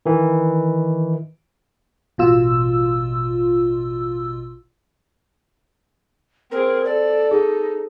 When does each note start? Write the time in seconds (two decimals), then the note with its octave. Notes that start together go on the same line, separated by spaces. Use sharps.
0.06 D#3 E3
2.18 A1 B2 F4 E6
6.51 C4 G#4 A#4
6.85 A4 D5
7.31 D#4 G#4